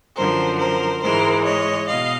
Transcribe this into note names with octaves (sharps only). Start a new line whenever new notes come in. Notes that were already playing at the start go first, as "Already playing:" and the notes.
F#2 D3 F3 A#4 C5
A#4 C5
G#2 E3 G#3 A#4 C5
C#5 D#5
B2 D#5 F5